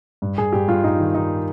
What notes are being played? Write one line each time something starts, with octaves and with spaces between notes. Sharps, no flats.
G2
G2 G#4
G2 G4
G2 F4
G2 D#4
D#3
D#3 D#4